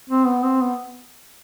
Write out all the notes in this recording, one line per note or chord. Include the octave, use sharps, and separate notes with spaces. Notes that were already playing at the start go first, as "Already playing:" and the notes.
C4
B3
C4
B3